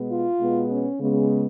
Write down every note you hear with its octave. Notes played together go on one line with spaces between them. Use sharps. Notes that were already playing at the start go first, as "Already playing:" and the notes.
Already playing: B2 G#3 B3
F4
B2 G#3 B3
C#4
C#3 G#3 B3